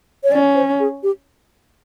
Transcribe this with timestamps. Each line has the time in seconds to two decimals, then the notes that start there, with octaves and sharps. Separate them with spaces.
0.24 C#5
0.32 C#4 D5
0.55 C5
0.80 G#4
1.03 G4